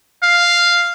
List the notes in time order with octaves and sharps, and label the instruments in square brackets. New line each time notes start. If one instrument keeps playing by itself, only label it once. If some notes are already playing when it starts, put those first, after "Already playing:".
[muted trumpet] F5